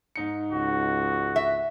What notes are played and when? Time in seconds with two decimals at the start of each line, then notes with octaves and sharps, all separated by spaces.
0.16 G#2 D#4 C#7
0.52 C#2 F#4
1.36 E5